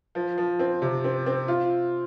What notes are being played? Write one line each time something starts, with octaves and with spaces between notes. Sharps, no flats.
F3
F3
C4
C3
C4
C4
F4